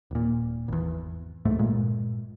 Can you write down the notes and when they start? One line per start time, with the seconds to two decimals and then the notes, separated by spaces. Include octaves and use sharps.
0.11 D#1 A#2
0.68 G#1 E2
1.45 C#2 G#2 A3
1.59 G1 A#2 G#3